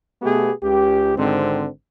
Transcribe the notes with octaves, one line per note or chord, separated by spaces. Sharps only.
B2 A3 B3 G4 G#4
C#2 G4
G#1 G#2 D3 C4